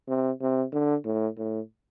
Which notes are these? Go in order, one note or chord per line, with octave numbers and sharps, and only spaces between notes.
C3
C3
D3
A2
A2